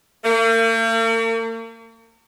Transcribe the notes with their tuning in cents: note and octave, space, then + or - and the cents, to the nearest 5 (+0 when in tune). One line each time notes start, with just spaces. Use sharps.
A#3 -45